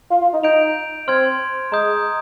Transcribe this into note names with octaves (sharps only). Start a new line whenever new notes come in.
F4
F4
D#4
D#4 G6 D7 F7
C4 C6 F6 G#6
G#3 A#5 D#6 G6